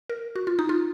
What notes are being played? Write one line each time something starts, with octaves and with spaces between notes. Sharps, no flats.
A#4
F#4
F4
D#4
F4